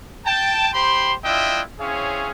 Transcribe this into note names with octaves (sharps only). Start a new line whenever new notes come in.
G5 A5
G4 C5 G5 B5 C6
D4 E4 F4 D#5 E5 G5
C4 C#4 E4 G#4 C#5 F5